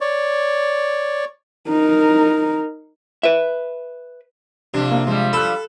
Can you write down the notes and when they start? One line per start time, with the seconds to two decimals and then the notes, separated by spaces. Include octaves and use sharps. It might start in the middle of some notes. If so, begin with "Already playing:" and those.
0.01 C#5 D5
1.68 D#4 A#4
3.23 B4 E5
4.74 F2 C3 D4
4.91 A#3
5.07 F3 G3 G#3
5.33 A4 B5 F#6